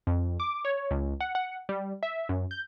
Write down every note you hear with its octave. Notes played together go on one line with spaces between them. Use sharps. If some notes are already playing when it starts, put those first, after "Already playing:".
F2
D6
C#5
C#2
F#5
F#5
G3
E5
F#2
G6